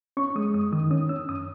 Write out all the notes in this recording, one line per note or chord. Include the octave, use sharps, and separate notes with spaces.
C#4 C#6
G#3 D#6
F#2 D#6
D#3 D#6
C#4 D#6
C#4 E6
F#2 D#6